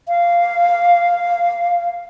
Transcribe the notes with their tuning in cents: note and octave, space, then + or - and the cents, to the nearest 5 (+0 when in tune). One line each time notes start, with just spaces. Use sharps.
F5 -5